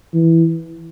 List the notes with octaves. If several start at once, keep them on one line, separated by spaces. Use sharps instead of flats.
E3